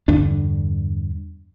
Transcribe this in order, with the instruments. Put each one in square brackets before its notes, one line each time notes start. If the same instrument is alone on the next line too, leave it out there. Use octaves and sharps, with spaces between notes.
[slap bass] E2 G2 D3 D4